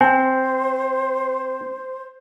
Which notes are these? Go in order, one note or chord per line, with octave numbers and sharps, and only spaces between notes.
C4 C5 G#5